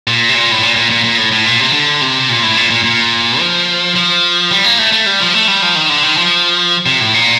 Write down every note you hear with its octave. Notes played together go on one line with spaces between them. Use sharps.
A#2
C3
A#2
A2
A#2
A#2
A#2
A#2
A2
A2
A#2
C3
D3
C3
A#2
A2
A#2
A#2
A#2
F3
F3
G3
A#3
A3
A3
G3
F3
A3
G3
F3
D#3
D3
D#3
F3
C3
A2
A#2